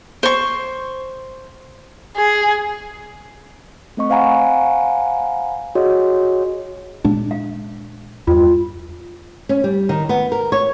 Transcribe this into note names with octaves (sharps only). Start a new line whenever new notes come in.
C5 C#6
G#4
A3 C4 D#5 C#6
C5 F5 F#5 G#5 A#5 B5
F#4 G#4 C#5 D#5
A#2 G#3 D4
F5
E2 G2 F4
C#4
G3
D#3
B3
A#4
C#5